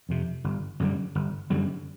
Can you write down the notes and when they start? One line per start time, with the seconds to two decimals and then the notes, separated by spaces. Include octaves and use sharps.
0.09 F2 C3
0.44 G1
0.80 F#2 D3 G3
1.15 G1
1.50 F#2 D3 G3